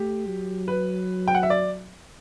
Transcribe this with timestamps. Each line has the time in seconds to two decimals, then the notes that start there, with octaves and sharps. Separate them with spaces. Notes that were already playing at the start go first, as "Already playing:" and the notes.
Already playing: A3 G4
0.26 F#3
0.68 B4
1.28 G5
1.35 F#5
1.43 E5
1.50 D5